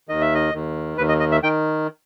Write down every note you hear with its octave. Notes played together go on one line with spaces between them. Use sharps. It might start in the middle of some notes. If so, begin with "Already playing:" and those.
D#2 D#3 D#5
E5
D#5
D#2 D#3
D#2 D#3 B4
D#5
D#5
E5
D#3 G5